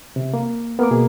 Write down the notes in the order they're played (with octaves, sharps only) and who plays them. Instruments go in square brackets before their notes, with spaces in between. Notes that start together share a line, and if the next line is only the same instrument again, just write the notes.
[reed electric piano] C3
A#3
[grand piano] A#3 [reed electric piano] B3 D6
[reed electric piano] B2 G#4